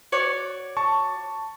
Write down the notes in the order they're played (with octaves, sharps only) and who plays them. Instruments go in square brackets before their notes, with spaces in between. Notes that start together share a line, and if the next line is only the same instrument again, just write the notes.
[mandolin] F#4 C#5 D5
[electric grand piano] A5 C#6